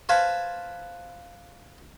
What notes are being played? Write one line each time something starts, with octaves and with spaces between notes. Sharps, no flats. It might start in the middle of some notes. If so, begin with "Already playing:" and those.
B4 C5 F5 G#5 A5 B5